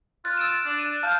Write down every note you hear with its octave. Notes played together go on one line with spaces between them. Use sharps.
F4 F#6 A6
E6 D7 E7
D4
D#7
F5 A5 G6